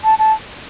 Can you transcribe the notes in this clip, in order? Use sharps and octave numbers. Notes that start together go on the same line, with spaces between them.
A5
A5